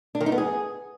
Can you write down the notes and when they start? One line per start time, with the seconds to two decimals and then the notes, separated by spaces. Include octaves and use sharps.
0.15 D4
0.20 D#3
0.26 D#4
0.32 B3
0.38 G#4